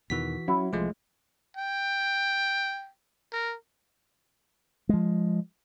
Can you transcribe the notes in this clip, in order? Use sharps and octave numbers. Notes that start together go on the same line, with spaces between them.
E2 B2 D#3 E3 F#4 B6
F#3 C#4 E4 F#4
C2 F3 G#3 A3 F4
G5
A#4
F3 G#3